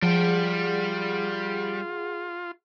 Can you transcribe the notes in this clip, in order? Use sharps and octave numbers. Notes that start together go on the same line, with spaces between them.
F3 G3 F4 G#4 F#5 G5